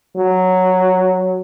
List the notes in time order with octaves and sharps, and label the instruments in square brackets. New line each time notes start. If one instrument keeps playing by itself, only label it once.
[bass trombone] F#3